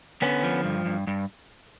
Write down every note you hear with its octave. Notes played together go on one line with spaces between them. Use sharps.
D3 B3 C#4
F3
G2
G2
G2